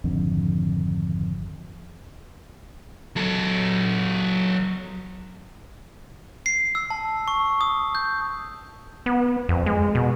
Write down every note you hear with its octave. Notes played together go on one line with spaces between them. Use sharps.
G#1 F2 D3 D4
F#3 A4
C7
E6
A5
C#6
D#6
G6
B3
F2
G#3
B2